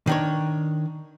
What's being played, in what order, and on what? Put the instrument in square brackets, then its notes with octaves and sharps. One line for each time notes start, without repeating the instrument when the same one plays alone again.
[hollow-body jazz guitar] D#3 D4 C#5